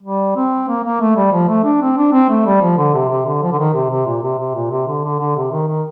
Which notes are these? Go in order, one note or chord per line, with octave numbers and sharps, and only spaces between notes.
G3
C4
A#3
A#3
A3
G3
F3
A3
D4
C4
D4
C4
A3
G3
F3
D3
C3
C3
D3
F3
D3
D#3
C3
C3
A#2
C3
C3
A#2
C3
D3
D3
D3
C3
D#3
D#3